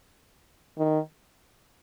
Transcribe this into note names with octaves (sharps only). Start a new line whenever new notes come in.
D#3